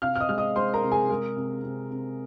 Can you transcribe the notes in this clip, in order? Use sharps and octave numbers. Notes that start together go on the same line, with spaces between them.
C3 F5 F6
F6
D#5 D#6
G#3 F6
D#5 D#6
G#3 C5 C6
A#4 A#5
C3
G#4 G#5
G#3 A#4
C3
C3
C3